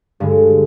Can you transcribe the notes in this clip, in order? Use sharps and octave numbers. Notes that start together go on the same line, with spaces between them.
G2 D3 G#3